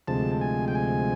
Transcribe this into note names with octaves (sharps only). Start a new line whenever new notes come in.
D2 C3 F3 G#3 A5
G#5
G5
G#5